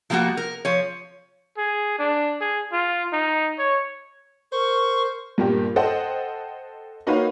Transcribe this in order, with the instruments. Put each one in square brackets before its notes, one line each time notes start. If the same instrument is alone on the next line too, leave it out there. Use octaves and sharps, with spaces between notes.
[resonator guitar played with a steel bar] F3 G3 A#3 F4 F#4
A#4
F3 C#5
[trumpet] G#4
D4
G#4
F4
D#4
C#5
[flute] A#4 [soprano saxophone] C5 [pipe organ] C#6
[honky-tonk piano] G2 A#2 A#3 G4
A4 C5 D#5 F#5 G5
A#3 D#4 F#4 B4 C#5 F5